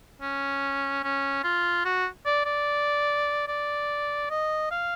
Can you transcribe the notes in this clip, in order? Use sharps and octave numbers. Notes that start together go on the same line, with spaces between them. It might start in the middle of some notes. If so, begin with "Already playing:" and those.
C#4
C#4
F4
F#4
D5
D5
D5
D#5
F5